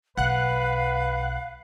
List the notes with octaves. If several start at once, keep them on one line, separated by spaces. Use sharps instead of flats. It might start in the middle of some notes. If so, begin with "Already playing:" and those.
B1 B4 F5 F#5 F#6